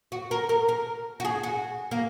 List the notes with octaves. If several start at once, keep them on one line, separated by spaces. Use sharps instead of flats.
F#4
A#4
A#4
A#4
F#4
G#4
F#4
A#3